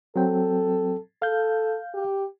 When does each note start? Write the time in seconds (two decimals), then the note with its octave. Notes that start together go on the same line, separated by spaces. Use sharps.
0.16 F#3 C4 A4 G5
1.22 A4 F5 G6
1.94 G4